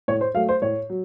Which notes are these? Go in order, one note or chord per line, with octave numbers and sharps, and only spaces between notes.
A2 C#5
C5
F#3 A3 F5
C5
A2 C#5
F#3